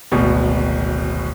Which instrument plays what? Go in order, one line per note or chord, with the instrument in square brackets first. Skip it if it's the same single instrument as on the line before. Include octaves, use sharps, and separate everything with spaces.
[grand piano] D1 G#1 B2